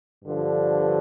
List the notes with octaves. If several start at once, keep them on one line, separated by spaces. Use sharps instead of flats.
G2 D3 F3